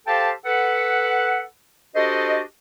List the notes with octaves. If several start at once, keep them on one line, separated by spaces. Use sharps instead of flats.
G4 A4 C5 F5 G5 A5
A4 B4 F#5
D4 F#4 G4 A4 C5 D#5